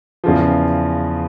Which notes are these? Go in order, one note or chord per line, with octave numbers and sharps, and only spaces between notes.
E2 C#3 F3